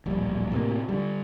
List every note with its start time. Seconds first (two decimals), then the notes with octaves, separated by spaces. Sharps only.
0.06 D1 A#1 G3
0.52 A2 C3 A#3
0.89 D3 G3